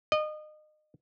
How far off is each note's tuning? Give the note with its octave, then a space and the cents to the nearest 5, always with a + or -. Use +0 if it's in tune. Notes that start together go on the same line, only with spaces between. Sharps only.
D#5 -30